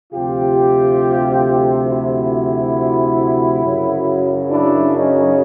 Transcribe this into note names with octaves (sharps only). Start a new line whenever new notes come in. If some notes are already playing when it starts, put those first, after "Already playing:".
D2 C3 F3 F4 G4
E4 F#4
F#2 C#3 F#3
D4 E4
C#4 D#4